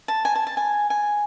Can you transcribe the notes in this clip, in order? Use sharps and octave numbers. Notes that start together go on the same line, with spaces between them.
A5
G#5
A5
A5
G#5
G#5